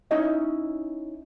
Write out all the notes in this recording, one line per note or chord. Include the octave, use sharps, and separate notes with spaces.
C#4 D#4 E4 D#5